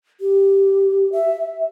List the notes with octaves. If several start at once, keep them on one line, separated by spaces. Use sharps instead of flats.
G4
E5